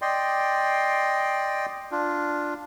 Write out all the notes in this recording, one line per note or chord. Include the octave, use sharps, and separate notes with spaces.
D5 D#5 G5 C6
D4 F4